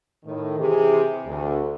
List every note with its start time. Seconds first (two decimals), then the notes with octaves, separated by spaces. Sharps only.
0.24 A2 D#3
0.58 C3 E3 E4 G4 G#4
1.25 D2